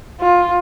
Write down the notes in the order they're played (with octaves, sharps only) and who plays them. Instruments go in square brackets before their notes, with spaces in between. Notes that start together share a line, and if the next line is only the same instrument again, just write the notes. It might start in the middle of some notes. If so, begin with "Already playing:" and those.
[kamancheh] F4